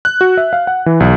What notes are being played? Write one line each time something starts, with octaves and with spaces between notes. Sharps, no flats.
F#6
F#4
E5
F5
F#5
E3
B1